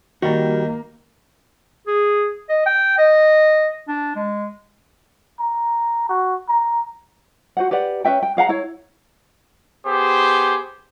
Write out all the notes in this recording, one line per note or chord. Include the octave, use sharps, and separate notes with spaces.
D#3 G3 A#3 F#4
G#4
D#5
G5
D#5
D4
G#3
A#5
F#4
A#5
F#4 C5 F#5
G4 B4 D5 F#5
C#4 B4 E5 G5
G5
G#4 F5 F#5 A#5
E4 C#5
B3 G4 G#4 C5